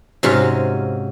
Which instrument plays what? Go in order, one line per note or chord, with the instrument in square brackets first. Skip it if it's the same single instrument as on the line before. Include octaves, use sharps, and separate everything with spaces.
[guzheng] G#2 F4 F#4 [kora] C3 F#3 C#4